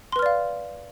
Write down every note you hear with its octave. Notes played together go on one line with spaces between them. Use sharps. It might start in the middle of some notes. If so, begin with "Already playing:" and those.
B4 D5 F5 C6 F6